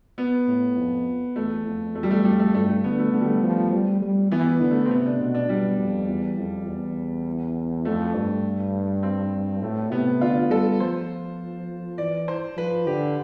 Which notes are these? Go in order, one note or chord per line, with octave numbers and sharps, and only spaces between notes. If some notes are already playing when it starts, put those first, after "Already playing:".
B3
A2
F2
E2 A3
F2
E2 A3
G3
A3
F2 G3
A3
G2 A3
A3
D3 B3
A3
D3 A3
G3
A3
F3
G3
G3
E3 B3
D3
A3
C4
C3 B3
D4
B2
D4
B2 G3
F2
E2
F2
E2
F2 A3
G2
C4
A2 A3
C3 B3
D3 F4
G3 A4
F3 C5
E3 D5
C5
F3 B4
D3 G4